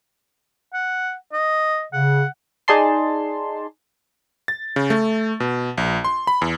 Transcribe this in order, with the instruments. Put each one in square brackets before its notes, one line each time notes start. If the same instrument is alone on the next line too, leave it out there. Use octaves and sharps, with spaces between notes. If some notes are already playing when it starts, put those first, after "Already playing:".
[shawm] F#5
D#5
[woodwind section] C#3 [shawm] F#5
[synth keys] D#4 G#4 D5 A5 C6
[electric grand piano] A6
C#3
A3
B2
A#1
C6
B5
E2